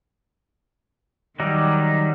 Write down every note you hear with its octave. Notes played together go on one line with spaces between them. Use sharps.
D#3 F#3 G3 D#4